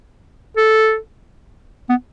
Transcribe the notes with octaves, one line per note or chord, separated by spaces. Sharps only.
A4
B3